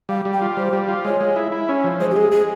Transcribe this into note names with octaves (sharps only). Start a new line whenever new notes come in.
G3 F5
G3
G5
F4
G3 C5
G3
F4
G#3 C#5
G#3
E4
E4
C#4
F3
G#3 C5
G4
G#3 G#4
G#3 G#4